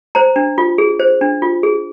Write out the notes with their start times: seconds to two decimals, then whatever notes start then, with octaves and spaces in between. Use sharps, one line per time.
0.15 C5 A#5
0.36 D4
0.58 F4
0.78 G#4
1.00 C5
1.21 D4
1.42 F4
1.63 G#4